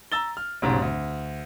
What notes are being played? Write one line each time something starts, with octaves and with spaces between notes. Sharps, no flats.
A#5 E6 A6 G7
F6
F1 B1 G#2 C#3
D2